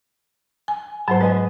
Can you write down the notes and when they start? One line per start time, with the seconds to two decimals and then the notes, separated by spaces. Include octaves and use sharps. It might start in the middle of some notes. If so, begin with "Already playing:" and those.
0.68 G#5
1.08 G#2 F#3 C5 F#5 A5
1.21 G#3 B4 D#5 G#5